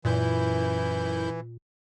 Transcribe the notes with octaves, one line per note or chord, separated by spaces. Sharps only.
F#2 A#2 E3 E4 G6